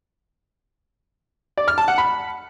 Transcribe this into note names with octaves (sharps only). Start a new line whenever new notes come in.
D5
F6
A5
F#5
B5